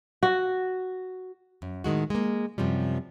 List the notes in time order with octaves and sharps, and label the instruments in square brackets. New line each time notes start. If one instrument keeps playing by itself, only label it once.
[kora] F#4
[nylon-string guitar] F#2
A2 D#3 G#3 F#4
G#3 A#3
F#2 C3 F3 G3